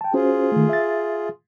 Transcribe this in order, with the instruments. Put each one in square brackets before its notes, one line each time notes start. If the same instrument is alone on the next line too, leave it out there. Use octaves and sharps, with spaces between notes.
[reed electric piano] G5 A5
[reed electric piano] C#4 F#4 C5 [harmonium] F4 G#4
[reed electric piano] D#3 A3
E5 A6